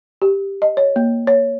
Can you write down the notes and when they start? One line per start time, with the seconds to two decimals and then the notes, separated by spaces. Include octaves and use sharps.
0.22 G4
0.62 D#5
0.77 C#5
0.96 A#3
1.27 C#5